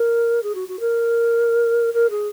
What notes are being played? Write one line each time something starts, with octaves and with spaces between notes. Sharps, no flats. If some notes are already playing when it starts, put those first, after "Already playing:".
Already playing: A#4
G#4
F#4
F#4
A#4
A#4
G#4